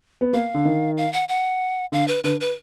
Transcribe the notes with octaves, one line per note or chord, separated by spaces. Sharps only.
B3
A#3 F5
D3
D#3
F5
F#5
F#5
D3 F5
B4
D3 B4
B4